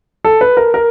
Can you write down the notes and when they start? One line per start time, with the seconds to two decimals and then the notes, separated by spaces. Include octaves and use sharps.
0.25 A4
0.41 B4
0.57 A#4
0.74 A#4